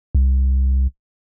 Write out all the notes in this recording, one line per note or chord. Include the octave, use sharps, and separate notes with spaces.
C2